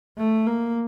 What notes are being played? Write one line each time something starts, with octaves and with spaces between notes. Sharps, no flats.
A3
A#3